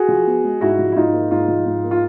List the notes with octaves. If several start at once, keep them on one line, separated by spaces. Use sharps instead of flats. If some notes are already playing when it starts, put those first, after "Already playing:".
Already playing: F#4 G#4
F3
B3
G#3
G#2 E4 F#4
F3
E4
G#2 D#4 F4
A#3
G#2 D#4 F4
F3
G#2
A#3
F4